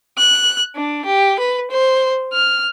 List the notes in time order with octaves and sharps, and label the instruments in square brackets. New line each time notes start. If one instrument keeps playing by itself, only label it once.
[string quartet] F#6
D4
G4
B4
C5
F6